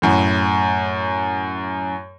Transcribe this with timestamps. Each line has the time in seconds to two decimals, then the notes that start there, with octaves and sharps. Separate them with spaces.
0.02 F#2 A2